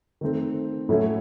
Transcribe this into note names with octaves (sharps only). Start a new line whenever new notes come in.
D#3 A3 C4
A2 F#3 A3 C#4 E4